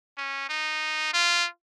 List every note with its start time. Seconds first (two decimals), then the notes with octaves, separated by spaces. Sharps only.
0.18 C#4
0.50 D#4
1.14 F4